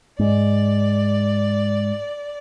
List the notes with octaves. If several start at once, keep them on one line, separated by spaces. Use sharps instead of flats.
G#2 D5